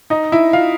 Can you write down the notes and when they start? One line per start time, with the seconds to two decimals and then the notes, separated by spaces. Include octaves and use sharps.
0.10 D#4 D#5
0.32 E4 E5
0.53 F4 F5